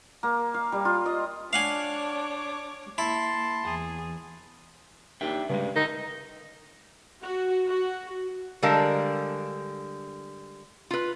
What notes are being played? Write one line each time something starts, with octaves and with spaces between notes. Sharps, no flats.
A#3
F5
G3
F4
D#5
D4 C#5 F5 F#5 G#5 D6
A#3 E4 A5 C6
E2 G#4
D#2 D4 E5 G5
G2 C#3 G3 G#3
D3 D#3 D#4
F#4
F#4
D3 G3 G#3 A#4 F5 A5
F4 B4